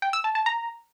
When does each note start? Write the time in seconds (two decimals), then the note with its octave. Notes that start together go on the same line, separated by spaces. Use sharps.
0.02 G5
0.13 E6
0.24 A5
0.35 A5
0.46 A#5